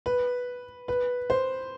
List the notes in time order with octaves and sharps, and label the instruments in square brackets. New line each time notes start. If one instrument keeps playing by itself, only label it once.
[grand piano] B4
B4
C5